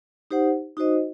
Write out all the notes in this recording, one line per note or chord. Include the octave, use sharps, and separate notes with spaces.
D#4 G4 C5 F#5
D#4 F#4 C5 D#5